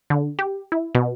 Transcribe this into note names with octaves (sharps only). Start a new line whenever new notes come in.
D3
G4
E4
B2